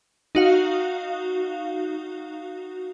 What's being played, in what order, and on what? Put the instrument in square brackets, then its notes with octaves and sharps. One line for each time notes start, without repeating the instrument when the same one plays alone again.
[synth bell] D#4 F#4 F5